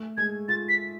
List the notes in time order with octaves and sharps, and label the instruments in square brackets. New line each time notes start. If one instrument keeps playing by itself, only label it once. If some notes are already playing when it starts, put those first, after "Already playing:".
Already playing: [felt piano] A3
[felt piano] G#3 [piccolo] G#6
[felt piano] F4 [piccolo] A6
[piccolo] B6